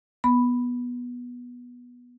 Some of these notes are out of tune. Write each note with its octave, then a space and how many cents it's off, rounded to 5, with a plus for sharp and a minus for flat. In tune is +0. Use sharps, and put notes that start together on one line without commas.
B3 -15 B5 +0